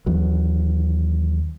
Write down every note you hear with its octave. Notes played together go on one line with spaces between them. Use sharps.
D#2 E3 F#3